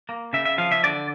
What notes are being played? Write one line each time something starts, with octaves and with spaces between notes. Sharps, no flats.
A#3
C#3 E5
E5
F3 F5
E5
D3 D5